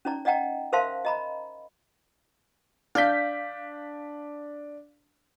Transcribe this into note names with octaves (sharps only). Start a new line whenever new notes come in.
C#4 D#4 D5 A#5
D5 D#5 F#5 G5 A#5
A#4 C5 E5 F5 A5 C6
D#5 A#5 B5
D4 F5 G6 B6